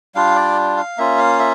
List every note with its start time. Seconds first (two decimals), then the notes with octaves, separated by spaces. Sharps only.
0.15 G3 D4 F4 F5
0.36 D5
0.77 F5
0.98 A#3 C#4 F4 E5
1.18 F5
1.39 E5